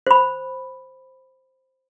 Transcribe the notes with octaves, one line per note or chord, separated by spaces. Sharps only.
C5 B5